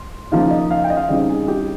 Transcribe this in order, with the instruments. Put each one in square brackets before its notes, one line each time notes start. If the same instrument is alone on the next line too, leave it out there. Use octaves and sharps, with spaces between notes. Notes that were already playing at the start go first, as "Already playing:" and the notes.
Already playing: [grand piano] C6
C#3 F3 A#3 D#4 F5
D#5
F5
G5
D#5
F5
C#3 G3 C4 D#4 D#5
G#4
G4